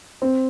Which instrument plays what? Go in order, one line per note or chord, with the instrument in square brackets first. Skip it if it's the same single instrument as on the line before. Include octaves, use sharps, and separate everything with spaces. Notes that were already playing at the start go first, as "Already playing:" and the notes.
[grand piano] C4